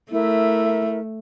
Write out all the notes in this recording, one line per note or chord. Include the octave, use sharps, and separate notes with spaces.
A3 E4 A#4 E5